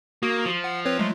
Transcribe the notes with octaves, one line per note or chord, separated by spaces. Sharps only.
A#3 F#4 D#6
F3
F#5
C4 B4 C#5
F#3 G#3 A3